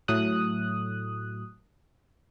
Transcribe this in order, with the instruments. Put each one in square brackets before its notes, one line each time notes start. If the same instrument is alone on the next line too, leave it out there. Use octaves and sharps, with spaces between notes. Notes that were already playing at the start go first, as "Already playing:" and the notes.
[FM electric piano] A2 F#3 A3 D#6 F#6